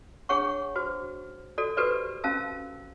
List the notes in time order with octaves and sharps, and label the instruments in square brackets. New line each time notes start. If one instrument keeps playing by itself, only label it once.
[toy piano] D4 G#4 C#5 F#5 C#6
F#4 C5
F#4 A4 D5
F#4 G4 A4 B4 C5 D5
C#4 F#4 F5 A5 E6